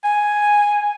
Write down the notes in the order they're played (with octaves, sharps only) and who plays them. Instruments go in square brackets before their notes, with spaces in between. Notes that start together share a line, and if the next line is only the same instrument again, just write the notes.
[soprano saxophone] G#5